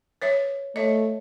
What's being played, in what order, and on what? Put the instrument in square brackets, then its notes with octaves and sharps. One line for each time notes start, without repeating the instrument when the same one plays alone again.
[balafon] B4 C#5 E5
[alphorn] A3 [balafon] C#5 D#5